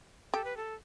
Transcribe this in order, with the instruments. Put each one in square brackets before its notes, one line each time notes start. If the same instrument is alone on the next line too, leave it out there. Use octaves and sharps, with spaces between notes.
[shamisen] G4 [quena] A4
[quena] B4
A4